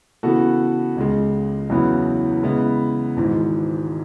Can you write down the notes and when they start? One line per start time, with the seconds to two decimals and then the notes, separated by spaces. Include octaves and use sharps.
0.23 C#3 E3 B3 F#4 A4
0.96 C#2 C#3 G#3
1.70 E2 C#3 F#3 B3 E4
2.43 C#3 G#3 B3 E4
3.17 G#1 G#2 E3